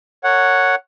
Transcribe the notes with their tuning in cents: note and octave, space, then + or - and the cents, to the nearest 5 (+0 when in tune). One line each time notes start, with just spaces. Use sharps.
A#4 -40 C#5 +0 F#5 +0